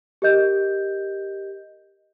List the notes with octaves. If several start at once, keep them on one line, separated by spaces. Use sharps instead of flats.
G4 A#4 D#5 G6